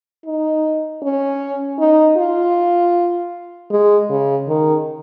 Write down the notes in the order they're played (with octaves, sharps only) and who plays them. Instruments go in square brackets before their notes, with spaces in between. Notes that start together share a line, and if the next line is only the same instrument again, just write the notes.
[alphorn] D#4
C#4
D#4
F4
G#3
C#3
D#3